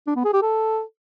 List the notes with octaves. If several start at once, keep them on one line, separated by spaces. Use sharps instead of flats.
D4
B3
G#4
G4
A4